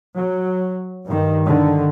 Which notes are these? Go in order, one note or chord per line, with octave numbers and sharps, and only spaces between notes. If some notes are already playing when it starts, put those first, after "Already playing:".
F#3
G2 D#3
D3 D#3